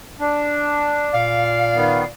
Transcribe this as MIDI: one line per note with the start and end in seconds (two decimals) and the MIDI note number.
0.20 1.15 62
1.13 2.07 46
1.13 2.07 74
1.13 2.07 77
1.75 2.04 51
1.75 2.04 59